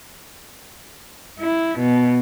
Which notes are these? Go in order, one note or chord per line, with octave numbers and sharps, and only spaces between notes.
E4
B2